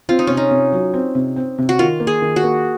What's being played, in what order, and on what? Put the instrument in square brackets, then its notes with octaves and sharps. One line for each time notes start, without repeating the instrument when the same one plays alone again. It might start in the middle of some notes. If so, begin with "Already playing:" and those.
[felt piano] C4 [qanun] F4
[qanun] D#4
[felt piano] C3 [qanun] C#4
[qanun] D#4
[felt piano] C3
F#3
C4
C3
C4
C3
[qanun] F#4
[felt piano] D#3 [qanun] F4
[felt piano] A#3
[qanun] G#4
[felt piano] D#3
[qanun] F#4
[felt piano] A#3